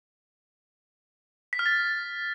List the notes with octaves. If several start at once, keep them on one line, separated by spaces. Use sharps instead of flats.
B6
F6
A6